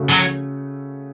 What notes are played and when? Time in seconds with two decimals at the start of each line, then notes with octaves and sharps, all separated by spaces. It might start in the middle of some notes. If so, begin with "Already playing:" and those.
Already playing: C#3 A3 F#4
0.10 F#3